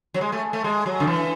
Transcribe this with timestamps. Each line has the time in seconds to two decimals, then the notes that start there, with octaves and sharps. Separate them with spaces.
0.14 F#3
0.21 G#3
0.32 A3
0.53 A3
0.64 G#3
0.86 F#3
1.00 D3
1.07 E3